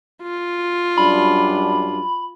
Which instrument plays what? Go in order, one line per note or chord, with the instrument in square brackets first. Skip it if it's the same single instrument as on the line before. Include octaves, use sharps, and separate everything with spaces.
[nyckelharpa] F4
[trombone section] F#2 G3 D4 [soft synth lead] B5